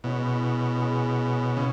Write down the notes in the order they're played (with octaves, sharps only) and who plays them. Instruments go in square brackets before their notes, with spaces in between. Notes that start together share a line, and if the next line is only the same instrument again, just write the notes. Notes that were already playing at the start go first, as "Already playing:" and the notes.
[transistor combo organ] B2 [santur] G#3 C#4 E4
[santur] G#3 C#4 G#4
[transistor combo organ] C#3 [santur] E4